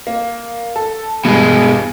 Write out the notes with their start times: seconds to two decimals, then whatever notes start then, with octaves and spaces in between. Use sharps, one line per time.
0.07 A#3
0.76 A4
1.25 E2 G2 B2 G#3